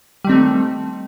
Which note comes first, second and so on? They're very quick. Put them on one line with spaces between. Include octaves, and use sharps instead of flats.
G3 D#3 C4 A3